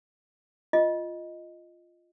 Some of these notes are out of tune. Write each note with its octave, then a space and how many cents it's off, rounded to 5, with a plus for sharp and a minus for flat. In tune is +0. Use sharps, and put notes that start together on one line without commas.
F4 -5 D#5 +0